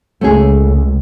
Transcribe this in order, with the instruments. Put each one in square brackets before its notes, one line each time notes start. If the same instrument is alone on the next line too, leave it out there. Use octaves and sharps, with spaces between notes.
[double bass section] C#2 [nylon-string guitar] A3 C#4 G#4